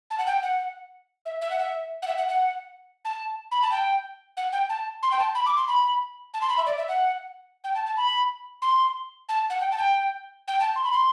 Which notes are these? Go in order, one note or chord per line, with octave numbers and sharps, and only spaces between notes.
A5
F#5
G5
F#5
E5
E5
F#5
E5
F#5
E5
F#5
F#5
A5
B5
A5
G5
F#5
G5
A5
C6
G5
A5
B5
D6
C6
B5
A5
C6
B5
E5
D5
E5
F#5
G5
A5
A5
B5
C6
A5
F#5
G5
A5
G5
G5
A5
C6
B5
C6